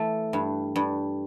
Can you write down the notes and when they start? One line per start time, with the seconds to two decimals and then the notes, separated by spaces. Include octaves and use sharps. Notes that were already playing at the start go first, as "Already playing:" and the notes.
Already playing: E3 A3
0.33 G2
0.76 G2